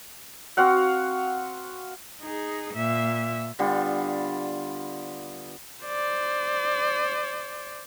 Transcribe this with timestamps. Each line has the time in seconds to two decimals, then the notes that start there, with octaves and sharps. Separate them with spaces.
0.57 C4 F#4 F5 F#5
2.21 D#4 G#4
2.74 A#2 E5
3.59 D3 G3 B3 F4
5.85 C5 D5